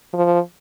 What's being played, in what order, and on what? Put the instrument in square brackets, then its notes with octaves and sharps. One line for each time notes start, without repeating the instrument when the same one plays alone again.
[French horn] F3